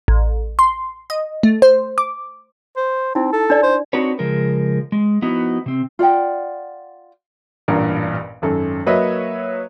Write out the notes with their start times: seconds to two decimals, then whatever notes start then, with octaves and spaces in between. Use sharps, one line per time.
0.08 A1
0.59 C6
1.10 D#5
1.43 A3
1.62 C5
1.98 D6
2.76 C5
3.15 C4 D#4 E4
3.33 A4
3.50 D4 D5
3.63 C5
3.93 C4 D4 D#4 F#4 B4 C#5
4.19 C#3 F3 G#3 A#4
4.92 G#3
5.22 F3 B3 D#4 E4 F#4
5.66 C3 C4
5.99 F4 D5 F#5 G5
7.68 A1 G2 A#2 A#4
8.42 G#1 F#2 A4
8.86 F#3 A#3 B4 C#5 D#5 E5